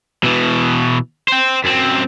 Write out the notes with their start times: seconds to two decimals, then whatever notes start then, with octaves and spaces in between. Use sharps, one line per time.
0.23 B2 E3
1.28 C5 G5
1.64 F#2 C4